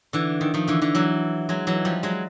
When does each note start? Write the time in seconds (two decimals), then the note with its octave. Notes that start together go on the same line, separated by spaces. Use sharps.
0.13 D3 E3
0.41 D#3
0.54 D#3 F3
0.67 D3 E3
0.81 D3 E3
0.95 E3 F#3
1.49 F#3 G#3
1.67 E3 F#3
1.85 F3 G3
2.03 F#3 G#3